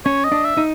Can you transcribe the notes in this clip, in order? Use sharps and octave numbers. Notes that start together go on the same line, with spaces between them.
C#4 C#5
D#5
D4
E5
D#4